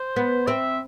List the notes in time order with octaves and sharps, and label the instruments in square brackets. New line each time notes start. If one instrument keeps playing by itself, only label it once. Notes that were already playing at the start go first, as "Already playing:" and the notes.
Already playing: [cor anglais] C5
[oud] B3
[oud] C4 [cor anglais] E5